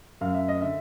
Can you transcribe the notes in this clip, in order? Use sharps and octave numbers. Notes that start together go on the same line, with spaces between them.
F#2 F5
E5
D#5
D3 E5